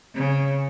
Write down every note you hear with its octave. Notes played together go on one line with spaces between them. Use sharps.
C#3